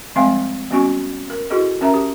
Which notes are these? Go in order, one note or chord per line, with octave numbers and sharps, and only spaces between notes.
F3 G3 G#3 C4 F5 G#5
G3 B3 C#4 F#4 G#5 C#6
A#4
E4 F#4 G#4 A4 D#5
C#4 A#4 E5 A5 A#5
G4